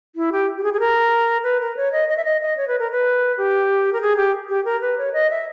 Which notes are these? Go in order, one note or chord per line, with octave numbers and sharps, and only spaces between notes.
E4
G4
G4
G#4
G#4
A#4
B4
A#4
C#5
D#5
D#5
E5
D#5
D#5
C#5
B4
A#4
B4
G4
A#4
G#4
G4
G4
A#4
B4
C#5
D#5
E5